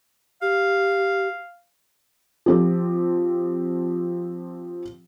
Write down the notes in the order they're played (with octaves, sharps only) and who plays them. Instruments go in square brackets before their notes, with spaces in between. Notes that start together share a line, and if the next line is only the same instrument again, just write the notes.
[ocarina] G4 [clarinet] F5
[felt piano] F3 C4 G4